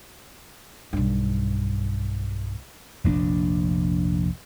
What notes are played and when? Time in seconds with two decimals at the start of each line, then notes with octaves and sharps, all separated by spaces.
0.93 B1 G2
3.04 F1 A#1 C#4 D4